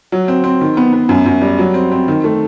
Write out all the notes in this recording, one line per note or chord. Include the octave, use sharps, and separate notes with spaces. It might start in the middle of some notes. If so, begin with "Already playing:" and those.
F#3
C4
C4
D#3
B3
B3
F#2
F#2
G3
F#3
C4
C4
D#3
A3